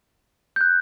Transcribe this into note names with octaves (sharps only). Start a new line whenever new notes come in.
G6
F#6